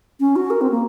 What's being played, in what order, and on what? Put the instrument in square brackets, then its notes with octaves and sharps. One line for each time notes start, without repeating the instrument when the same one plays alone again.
[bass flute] C#4
F#4
A#4
C4
A#3